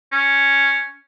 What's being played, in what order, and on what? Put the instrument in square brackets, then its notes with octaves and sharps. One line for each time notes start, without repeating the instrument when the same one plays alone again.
[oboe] C#4